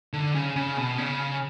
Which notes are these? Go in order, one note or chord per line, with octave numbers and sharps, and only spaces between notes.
D3
C#3
C#3
B2
C#3